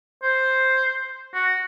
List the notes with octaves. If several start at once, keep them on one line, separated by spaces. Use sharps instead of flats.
C5
F#4